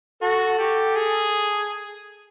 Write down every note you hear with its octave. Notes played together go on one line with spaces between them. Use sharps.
F#4 A4
G4
G#4